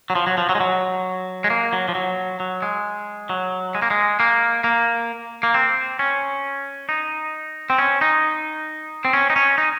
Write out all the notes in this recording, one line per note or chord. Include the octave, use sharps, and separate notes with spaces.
F#3
F3
F#3
F3
F#3
G#3
F#3
G#3
A#3
F#3
F3
F#3
F#3
G#3
F#3
G#3
A#3
G#3
A#3
A#3
A#3
C4
C#4
D#4
C4
C#4
D#4
C4
C#4
D#4
C#4
D#4